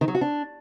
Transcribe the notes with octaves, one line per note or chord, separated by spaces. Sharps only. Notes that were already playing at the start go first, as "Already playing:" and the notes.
D#3
F#3
F#4
D4